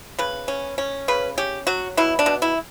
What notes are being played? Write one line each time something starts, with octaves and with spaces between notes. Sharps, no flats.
C#3 B4
C#4
C#4
C#3 B4
C#4 G4
F#3 F#4
B2 E4
D4
B2
E4